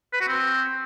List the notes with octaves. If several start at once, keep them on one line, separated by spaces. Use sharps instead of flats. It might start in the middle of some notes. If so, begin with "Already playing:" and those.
B4
F#4
C4